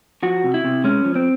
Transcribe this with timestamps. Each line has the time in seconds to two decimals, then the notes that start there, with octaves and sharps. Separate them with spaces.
0.23 F3 F#4
0.44 C3
0.54 E4
0.65 C3
0.84 G#3 C#4
1.04 F3
1.16 C4